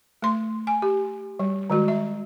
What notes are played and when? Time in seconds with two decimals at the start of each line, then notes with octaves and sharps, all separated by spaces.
0.22 A3 C6
0.67 G#5
0.82 G4
1.39 G3
1.70 D#3 G#3 F#4
1.88 E5